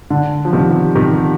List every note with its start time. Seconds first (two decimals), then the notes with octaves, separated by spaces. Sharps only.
0.10 D3
0.45 F3
0.53 C3 D#3
0.96 C3 D#3